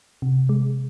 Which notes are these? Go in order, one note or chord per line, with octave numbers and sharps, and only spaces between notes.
C3
G#3